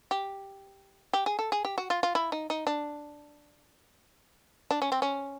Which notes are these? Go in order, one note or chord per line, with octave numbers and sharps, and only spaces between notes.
G4
G4
G#4
A4
G#4
G4
F#4
F4
F4
E4
D#4
D#4
D4
D4
C#4
C4
C#4